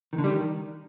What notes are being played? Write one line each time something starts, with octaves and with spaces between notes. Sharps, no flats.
D#3
D3
G3
D#3